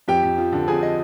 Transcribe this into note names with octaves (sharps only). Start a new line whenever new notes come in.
F2 G4 G5
F2
F3
D3
F2 G#4 G#5
D#5